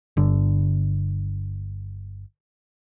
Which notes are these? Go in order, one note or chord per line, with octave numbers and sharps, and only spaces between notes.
G1 D3